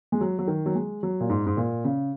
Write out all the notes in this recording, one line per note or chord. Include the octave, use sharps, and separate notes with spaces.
G#3
F#3
F#3
D#3
F#3
G#3
F#3
A#2
G#2
G#2
A#2
C#3